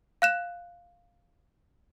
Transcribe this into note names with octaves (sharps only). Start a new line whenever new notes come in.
F5 F#6 E7